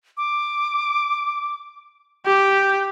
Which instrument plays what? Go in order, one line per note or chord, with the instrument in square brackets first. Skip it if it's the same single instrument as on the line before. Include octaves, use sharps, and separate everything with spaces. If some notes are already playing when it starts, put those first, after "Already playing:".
[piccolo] D6
[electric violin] G4 [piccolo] G6